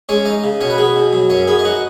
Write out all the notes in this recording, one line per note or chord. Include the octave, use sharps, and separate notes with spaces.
G#3 C#4 C#5
D#4 D#5
C#3
B2 C#4 C#5
B4
B3 G#4
B2
F#3
F#2 C#4 C#5
B3 G#4 G#5
D#5
D#4 F#4 F#5